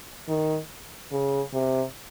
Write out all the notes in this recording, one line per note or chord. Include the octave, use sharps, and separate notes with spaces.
D#3
C#3
C3